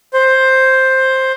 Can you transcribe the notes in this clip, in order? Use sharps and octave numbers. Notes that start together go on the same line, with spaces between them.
C5